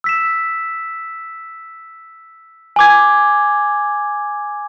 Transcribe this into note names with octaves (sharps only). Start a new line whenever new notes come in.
E6 B6 E7
G#5 D6 G#6